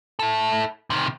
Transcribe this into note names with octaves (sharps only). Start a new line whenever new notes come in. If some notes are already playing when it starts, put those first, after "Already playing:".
E4 A4
C3 D#3